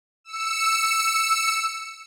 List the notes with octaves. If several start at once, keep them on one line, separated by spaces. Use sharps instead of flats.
E6 C#7